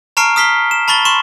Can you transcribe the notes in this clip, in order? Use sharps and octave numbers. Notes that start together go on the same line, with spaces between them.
A5 A#5 C#6 F6 C7 D7
D#6 F6 B6 C7 G7
E7
A5 B5 C#6 A6 G7
C6 C#6 E7